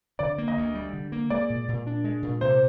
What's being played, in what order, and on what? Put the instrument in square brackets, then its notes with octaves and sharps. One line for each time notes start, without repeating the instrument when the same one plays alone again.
[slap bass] D3 [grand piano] D5
[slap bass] A#3
[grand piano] D#5
[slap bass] D2
G3
D3
A#3
[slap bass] G#3 [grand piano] D5
[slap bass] A#2
A#2
D4
G#3
A#2
[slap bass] C3 [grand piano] C5